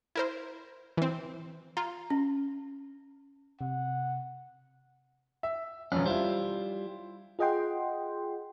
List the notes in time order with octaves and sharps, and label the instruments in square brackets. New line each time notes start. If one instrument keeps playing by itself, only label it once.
[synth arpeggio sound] E4 A#4 C5
E3 C4
[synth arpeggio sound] F4 [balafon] A#5
[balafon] C#4
[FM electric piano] C3 [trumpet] F#5
[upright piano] E5
[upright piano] E1 F2 [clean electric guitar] C#4
[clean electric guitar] G3 F4 [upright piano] E4 C5
[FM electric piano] F4 G#4 D#5 F#5 G5 C6